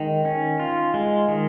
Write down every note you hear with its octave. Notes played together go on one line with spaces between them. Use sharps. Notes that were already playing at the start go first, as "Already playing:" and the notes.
Already playing: D#3 G#3
C#4
F4
G#3
D#3